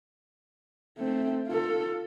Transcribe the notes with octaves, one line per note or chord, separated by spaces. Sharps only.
A3 C4
F4 A4